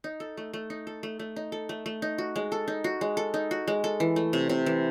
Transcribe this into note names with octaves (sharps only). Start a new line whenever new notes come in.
D#4
A4
A3
A3
D#4
A4
A3
A3
D#4
A4
A3
A3
D#4
F#4
G#3
A4
D#4
F#4
G#3
A4
D#4
F#4
G#3
A4
E3
A3
C3
C3
E3